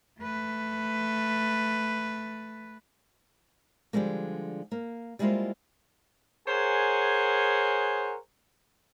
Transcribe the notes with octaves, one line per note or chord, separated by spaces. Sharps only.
A3 B4
D3 F3 G3 G#3 A#3
A#3
G3 G#3 A#3 E4 F4 C5
G#4 A#4 C5 C#5 F#5 G#5